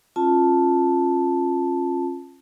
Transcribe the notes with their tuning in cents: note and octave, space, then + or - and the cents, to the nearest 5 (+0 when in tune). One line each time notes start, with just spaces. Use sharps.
C#4 -35 F4 +0 A5 +0